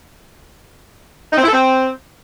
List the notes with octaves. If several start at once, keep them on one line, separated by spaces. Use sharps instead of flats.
D#4
C4
E4
A4
C4